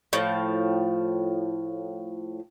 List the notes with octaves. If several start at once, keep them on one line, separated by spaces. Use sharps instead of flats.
A2 F3